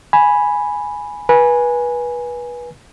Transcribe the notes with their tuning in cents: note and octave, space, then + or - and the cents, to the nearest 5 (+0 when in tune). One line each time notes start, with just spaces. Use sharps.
G#5 +0 B5 -5
B4 -25 G#5 +0